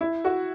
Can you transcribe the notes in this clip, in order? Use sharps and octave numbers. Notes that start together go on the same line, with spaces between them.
E4
F#4